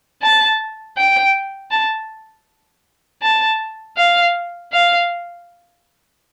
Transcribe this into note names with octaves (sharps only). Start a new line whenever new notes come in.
A5
G5
A5
A5
F5
F5